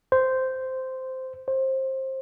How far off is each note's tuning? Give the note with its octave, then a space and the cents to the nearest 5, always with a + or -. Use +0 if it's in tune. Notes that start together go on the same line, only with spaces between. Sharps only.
C5 -10
C5 +20